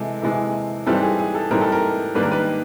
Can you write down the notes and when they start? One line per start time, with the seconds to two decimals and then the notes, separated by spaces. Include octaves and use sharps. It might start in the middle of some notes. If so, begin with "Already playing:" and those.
Already playing: C3 E3 G#3 A4
0.22 C3 E3 G#3
0.86 G#2 E3 G3 C4 A4
1.03 G#4
1.19 G#4
1.35 A4
1.50 G#2 E3 G3 C4 A#4
1.61 A4
1.72 A#4
2.15 G#2 D#3 G3 A#3 D4 B4
2.23 A#4
2.31 B4